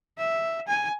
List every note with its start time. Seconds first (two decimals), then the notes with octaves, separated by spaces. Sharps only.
0.18 E5
0.68 G#5